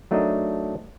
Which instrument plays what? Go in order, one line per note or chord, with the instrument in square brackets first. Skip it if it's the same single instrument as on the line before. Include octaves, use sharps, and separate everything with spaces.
[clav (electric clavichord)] F#3 A3 D4 D#4 A#4 D#5